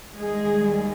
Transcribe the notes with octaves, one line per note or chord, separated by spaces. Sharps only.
D#2 D#3 G3 G#3 G#4